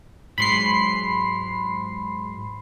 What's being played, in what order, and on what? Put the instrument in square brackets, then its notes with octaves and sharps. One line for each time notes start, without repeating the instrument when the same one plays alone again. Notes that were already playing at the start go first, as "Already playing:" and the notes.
[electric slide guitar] G#2 F#3 G#3 [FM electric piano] B5 C6 C7